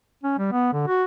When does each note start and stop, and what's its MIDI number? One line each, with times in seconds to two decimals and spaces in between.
0.24 0.34 61
0.39 0.50 55
0.52 0.72 59
0.73 0.87 50
0.87 1.05 66